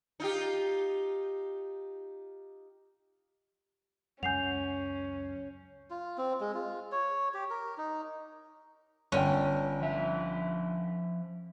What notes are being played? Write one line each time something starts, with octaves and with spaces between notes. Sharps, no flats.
D#4 F4 G4
C#2 F#2 C#4 F#5 G#5 G6 C7 F7
F4
C4
G#3
F4
C#5
G4
A#4
D#4
G1 D3 C#4 G5
F3 E5